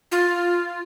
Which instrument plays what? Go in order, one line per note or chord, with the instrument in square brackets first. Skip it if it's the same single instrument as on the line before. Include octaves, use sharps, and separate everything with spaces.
[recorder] F4